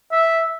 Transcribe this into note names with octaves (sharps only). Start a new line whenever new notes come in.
E5